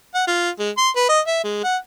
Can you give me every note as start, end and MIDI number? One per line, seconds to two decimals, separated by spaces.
0.14 0.24 78
0.27 0.50 65
0.59 0.70 56
0.77 0.89 84
0.96 1.08 71
1.09 1.20 75
1.27 1.42 76
1.44 1.61 56
1.63 1.76 78